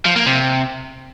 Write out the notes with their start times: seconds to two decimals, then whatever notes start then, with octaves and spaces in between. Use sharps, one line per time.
0.06 F3
0.16 A#3
0.26 C3